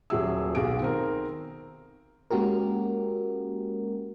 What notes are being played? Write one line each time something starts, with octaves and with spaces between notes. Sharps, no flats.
D#1 A#2 F#3 G#4 E5 E6
B1 F#4 G#4 D7
D#3 C4 A#4
G#3 A#3 C#4 F#4 G4 A#4